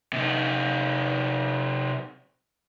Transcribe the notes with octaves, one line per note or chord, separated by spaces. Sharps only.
C3 D#4